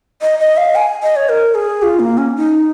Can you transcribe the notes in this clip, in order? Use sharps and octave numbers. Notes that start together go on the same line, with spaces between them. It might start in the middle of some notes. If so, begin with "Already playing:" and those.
D#5
D#5
F5
G#5
D#5
C#5
A#4
G#4
F4
A#3
C#4
D#4